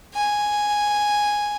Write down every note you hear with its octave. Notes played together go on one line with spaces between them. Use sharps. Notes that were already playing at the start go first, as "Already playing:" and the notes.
G#5